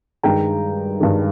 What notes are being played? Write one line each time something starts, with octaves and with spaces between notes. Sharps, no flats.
G2 D#3 G#3 G5 A#5
G2 D#3 G#3